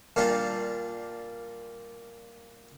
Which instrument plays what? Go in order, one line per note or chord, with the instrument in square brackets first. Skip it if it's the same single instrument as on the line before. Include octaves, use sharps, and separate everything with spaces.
[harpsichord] A#2 G3 D4 F4